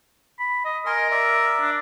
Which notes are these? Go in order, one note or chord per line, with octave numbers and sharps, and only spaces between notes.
B5
D#5
A#4 D#5 G#5 C6
D5 E5
D4